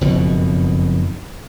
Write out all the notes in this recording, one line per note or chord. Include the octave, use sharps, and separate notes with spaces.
F#1 F2 B2 D#3